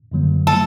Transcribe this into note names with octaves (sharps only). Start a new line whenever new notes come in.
F#2 D3 F#3 A#3
C#3 F3 A3 A4